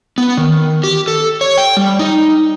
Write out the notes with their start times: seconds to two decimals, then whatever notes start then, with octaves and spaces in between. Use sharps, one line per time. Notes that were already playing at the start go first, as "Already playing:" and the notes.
0.18 B3
0.37 D#3
0.84 G4
1.08 A4
1.41 C#5
1.58 G5
1.77 G3
1.99 D#4